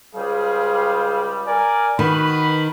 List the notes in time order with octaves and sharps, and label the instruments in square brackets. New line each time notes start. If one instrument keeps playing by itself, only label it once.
[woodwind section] C#2 C#3 G3 [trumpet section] G#4 C5 F5
[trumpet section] A#4 D5 G#5
[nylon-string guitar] D#3 [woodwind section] F#4 B4 [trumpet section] B5